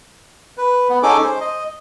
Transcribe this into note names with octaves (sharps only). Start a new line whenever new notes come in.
B4
B3
C#4 D#4 G#4 A4 D6
C5
D#5